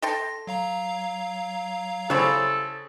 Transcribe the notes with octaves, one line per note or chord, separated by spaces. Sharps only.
A4 G5 C6 A#6
F#3 F5 A#5
C#3 G3 C4 E4 A4